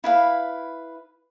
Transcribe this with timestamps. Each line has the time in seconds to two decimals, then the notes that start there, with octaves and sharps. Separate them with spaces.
0.04 E4 B4 F5